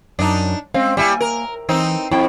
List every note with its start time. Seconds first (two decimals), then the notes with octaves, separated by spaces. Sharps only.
0.19 F#2 D4 D#4
0.74 G#3 C4 C#4 F5
0.97 G3 A#3 E4 G5 G#5
1.21 A#4
1.69 E3 C4 D#4
2.11 F2 E4 G5